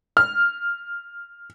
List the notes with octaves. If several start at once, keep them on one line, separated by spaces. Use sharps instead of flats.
F6